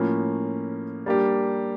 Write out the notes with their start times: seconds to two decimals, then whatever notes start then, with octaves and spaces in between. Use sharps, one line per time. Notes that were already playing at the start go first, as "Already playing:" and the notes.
Already playing: A2 F3 A#3 C#4
1.06 G3 A#3 D4 G4